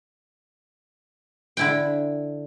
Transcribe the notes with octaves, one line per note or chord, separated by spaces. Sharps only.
D3 E4 G5